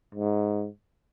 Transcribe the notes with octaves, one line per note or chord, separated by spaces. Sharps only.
G#2